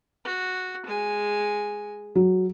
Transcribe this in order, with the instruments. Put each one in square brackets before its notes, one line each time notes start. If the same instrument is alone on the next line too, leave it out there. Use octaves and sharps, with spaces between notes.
[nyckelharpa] F#4
G#3 G#5
[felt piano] F#3